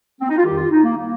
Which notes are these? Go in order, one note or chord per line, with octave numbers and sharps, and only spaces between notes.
C4
D#4
F4
F2 D#3 G3 G4
F4
D#4
A#3
D#3 G3 A#3